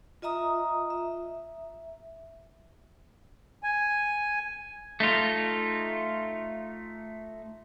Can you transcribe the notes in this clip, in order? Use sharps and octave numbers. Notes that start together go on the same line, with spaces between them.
F4 D#5 E5 A#5 D#6
E5
G#5
A3 D#4 F4